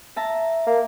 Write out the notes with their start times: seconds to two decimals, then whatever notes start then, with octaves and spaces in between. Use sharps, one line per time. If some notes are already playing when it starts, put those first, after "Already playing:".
0.16 E5 A5 A#5
0.67 A#3